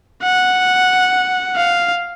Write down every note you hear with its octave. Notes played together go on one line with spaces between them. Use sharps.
F#5
F5